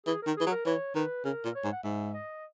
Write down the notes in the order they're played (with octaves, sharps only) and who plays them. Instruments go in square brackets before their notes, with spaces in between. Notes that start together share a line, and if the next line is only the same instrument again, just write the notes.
[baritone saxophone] E3 [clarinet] G#4
[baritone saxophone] D#3 [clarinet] A#4
[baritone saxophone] E3 [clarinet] G#4
[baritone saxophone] F#3
[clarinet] A#4
[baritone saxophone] E3 [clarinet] C#5
[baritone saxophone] D#3 [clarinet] B4
[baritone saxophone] C#3 [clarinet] A#4
[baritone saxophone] A#2
[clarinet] C#5
[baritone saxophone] G#2
[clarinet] F#5
[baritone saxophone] G#2 [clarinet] E5
[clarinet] D#5